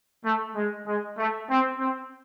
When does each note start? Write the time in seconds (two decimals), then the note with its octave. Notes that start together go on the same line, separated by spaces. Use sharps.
0.25 A3
0.55 G#3
0.87 G#3
1.18 A3
1.49 C4
1.79 C4